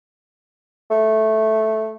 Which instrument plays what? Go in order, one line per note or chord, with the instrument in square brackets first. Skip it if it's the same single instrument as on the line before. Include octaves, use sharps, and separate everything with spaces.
[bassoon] A3